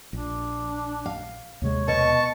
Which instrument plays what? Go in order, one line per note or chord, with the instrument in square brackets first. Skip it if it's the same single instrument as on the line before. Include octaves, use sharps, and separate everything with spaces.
[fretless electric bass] A#1 [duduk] D4
[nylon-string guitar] F5
[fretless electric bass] D#2 C3 G#3 [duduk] C#5
[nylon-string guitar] B2 [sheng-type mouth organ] A5 C#6